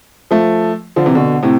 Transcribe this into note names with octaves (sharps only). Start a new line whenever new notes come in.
F3 A3
D3 F3
C3 E3
B2 D3
A2 C3